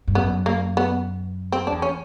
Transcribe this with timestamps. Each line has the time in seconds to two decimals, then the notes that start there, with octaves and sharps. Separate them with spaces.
0.07 G2
0.15 F#2 B3
0.46 A#3
0.77 B3
1.52 C4
1.67 D4
1.72 E2
1.82 C#4